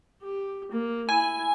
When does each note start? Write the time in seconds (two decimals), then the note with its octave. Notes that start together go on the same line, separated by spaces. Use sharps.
0.23 G4
0.71 A#3
1.09 E4 G#5